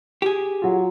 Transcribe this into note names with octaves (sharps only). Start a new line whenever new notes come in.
G4 G#4
F#3 F4